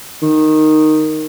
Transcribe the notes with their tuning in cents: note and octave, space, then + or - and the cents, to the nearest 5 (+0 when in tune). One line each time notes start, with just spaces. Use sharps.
D#3 -5